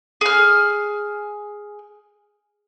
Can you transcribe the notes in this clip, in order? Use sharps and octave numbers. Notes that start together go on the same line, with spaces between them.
G#4 F6